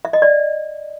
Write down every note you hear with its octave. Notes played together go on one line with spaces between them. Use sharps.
E5
D#5
D5